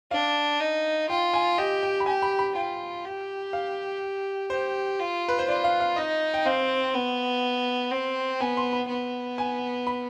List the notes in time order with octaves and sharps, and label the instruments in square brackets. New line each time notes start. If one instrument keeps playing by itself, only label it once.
[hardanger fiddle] D4 [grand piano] F5
[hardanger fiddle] D#4
[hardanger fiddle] F4 [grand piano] G5
[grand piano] G#5
[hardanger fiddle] G4 [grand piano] D#5
[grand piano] G5
B5
[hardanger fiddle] G4 [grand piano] G#5
[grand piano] B5
B5
[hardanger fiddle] F4 [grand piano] G5
[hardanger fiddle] G4
[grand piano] F5
[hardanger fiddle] G4 [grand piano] C5
[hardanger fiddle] F4
[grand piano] B4
C5
[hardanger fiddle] F4 [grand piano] D5
[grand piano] F5
F5
[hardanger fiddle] D#4 [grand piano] D#5
[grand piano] G5
[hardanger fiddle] C4 [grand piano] F5
[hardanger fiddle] B3
C4
[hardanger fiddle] B3 [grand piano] G#5
[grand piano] C6
B5
[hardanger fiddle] B3
[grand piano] G#5
B5